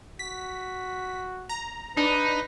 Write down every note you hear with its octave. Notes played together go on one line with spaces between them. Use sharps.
F#4 B6
A#5
D4 D#4 B4